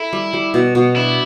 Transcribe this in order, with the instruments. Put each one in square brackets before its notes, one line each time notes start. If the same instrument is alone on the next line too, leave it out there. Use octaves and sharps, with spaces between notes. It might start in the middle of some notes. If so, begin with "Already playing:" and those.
Already playing: [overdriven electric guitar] E4 [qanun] A4
[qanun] G3
G3
B2
B2
[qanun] D4 [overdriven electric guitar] E4